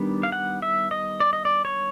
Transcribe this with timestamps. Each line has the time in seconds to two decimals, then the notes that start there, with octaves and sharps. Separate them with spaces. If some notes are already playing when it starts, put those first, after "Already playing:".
Already playing: D#3 G3 B3 D4
0.23 F5
0.32 F#5
0.62 E5
0.91 D#5
1.20 D5
1.33 D#5
1.45 D5
1.65 C#5